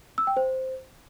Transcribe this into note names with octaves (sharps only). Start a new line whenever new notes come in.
E6
G5
C5